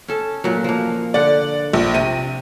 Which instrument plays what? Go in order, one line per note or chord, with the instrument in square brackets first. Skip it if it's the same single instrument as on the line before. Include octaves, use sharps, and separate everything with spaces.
[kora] C#4 A4
A#2 F#3
F3 A#3
[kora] D3 F#5 [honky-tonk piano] D5
[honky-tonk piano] A#1
[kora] C3 [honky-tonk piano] D#7